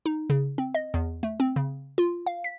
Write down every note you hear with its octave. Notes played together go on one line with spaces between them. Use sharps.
D#4
C#3
C4
D#5
E2
A3
C4
C#3
F4
F5
B6